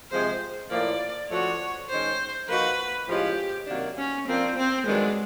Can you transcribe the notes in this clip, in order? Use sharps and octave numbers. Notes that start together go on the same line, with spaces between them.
C3 F3 G#3 C5
A2 F3 A#3 D5
F3 A3 D4 F#4 C#5
D#3 G#3 C#4 C5
F3 A#3 D#4 F#4 B4
A2 F3 G#3 C#4 F4 G4
C3 D#3 F#3 A#3 D4
C#4
F3 A#3 C4 D4 F4
C4
G2 D#3 F#3 G#3 B3 D4